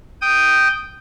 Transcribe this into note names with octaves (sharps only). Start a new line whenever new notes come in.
G5 D#6